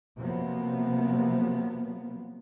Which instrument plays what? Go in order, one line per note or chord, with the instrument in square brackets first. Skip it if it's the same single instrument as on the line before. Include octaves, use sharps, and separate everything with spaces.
[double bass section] C3 F3 F#3 A#3 B3